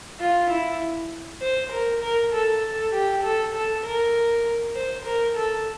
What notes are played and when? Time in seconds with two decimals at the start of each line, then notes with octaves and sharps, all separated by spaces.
0.20 F4
0.50 E4
1.41 C5
1.72 A#4
2.02 A#4
2.33 A4
2.93 G4
3.23 A4
3.54 A4
3.85 A#4
4.75 C5
5.05 A#4
5.36 A4